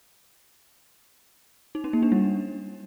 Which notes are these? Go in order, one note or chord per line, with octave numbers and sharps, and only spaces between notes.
D#4
C#4
A#3
D4
G3